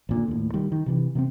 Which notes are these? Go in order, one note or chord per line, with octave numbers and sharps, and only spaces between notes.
G#1 A#2 D3
D#2 A2
D#3 G3
D#3
C3 D#3 E3
C3 A#3 C4